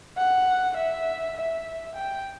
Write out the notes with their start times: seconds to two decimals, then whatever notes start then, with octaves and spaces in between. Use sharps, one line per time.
0.17 F#5
0.76 E5
1.35 E5
1.95 G5